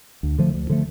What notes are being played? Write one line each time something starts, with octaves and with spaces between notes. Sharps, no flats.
D2
D3 F3 A3
D2
D3 F3 A3